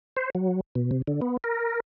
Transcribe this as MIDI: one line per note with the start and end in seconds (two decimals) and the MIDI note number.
0.17 0.30 72
0.35 0.60 54
0.75 0.91 47
0.91 1.02 48
1.07 1.20 50
1.21 1.37 59
1.44 1.80 70